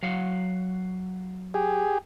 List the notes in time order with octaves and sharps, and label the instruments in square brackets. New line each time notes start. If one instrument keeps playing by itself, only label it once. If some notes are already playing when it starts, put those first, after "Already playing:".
[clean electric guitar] F#3 F5 F#5
[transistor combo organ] G4 G#4